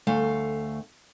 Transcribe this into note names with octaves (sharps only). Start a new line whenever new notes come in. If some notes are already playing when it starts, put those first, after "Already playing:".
D2 A3 F5